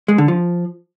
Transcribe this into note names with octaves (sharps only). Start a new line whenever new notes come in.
G#3
D3
F3